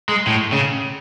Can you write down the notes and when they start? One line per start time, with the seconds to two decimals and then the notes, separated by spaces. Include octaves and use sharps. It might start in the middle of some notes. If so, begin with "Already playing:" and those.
0.09 G#3
0.27 A2
0.52 C#3